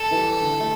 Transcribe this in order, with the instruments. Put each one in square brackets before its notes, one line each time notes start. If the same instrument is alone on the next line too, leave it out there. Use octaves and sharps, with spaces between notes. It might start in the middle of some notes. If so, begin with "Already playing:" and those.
Already playing: [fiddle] A4
[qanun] E3
G3
D3
A3